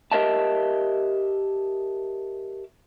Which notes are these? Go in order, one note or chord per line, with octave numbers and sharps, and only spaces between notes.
G4 A#4 D#5 E5 A5